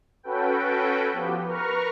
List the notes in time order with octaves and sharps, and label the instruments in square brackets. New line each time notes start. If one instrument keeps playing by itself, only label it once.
[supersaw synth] C#4 F#4 A4 B4 G5
F3 B3 G4
A#4 B4 A#5 C#6 F6